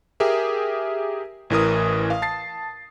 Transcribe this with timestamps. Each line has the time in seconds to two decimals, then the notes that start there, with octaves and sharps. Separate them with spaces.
0.20 G4 G#4 A#4 E5
1.50 A1 E3 A#4 D#6
2.10 F5
2.22 A5 A6 C7